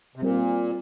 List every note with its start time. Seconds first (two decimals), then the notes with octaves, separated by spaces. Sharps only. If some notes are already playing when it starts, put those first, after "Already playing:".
0.16 C3
0.22 A#2 G3 C4 A#4